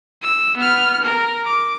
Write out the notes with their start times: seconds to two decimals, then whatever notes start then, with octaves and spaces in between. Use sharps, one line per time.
0.22 E6
0.57 B3 F6
1.02 A#4
1.44 D6